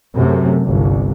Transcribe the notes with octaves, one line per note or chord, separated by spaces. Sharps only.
F#2 C3 A3
G1 C2